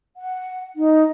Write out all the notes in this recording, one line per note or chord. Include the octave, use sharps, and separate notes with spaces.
F#5
D#4